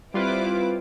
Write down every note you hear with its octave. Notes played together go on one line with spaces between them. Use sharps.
G3 C4 E4 F4 B4 D6